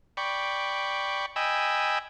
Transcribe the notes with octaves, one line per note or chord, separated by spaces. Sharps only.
D5 G5 B5 C#6
D#5 G5 G#5 B5 E6